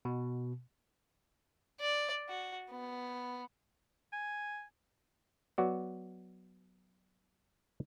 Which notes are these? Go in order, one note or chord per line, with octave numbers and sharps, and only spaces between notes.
B2
D5
F#4
B3
G#5
F#3 B3 F#4 D5